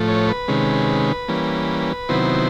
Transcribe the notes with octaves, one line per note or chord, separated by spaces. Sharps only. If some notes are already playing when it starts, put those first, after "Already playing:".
Already playing: A2 F3 A3
C#5
B4
C3 D#3 G#3 C#4
E3 G3 A#3 C#4
C3 D#3 F#3 B3 E4 C5